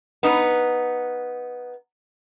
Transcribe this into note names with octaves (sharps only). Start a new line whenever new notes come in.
B3 D#4